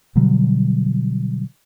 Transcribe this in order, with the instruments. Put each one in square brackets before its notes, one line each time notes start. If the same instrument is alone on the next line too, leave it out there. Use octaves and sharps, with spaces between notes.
[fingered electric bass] B2 D3 F#3 G3